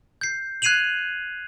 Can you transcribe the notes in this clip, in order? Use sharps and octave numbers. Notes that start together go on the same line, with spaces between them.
G6 C7
F#6 G#6 C7 D#7 F7 F#7